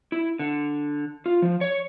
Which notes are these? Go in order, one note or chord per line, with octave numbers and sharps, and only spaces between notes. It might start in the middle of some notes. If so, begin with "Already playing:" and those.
E4
D3
F4
F3
C#5